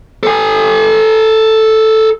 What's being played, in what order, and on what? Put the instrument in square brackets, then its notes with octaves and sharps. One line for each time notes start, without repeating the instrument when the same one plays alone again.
[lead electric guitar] A4 G#5